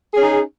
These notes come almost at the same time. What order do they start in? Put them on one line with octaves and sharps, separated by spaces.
G#4 C#4 D#4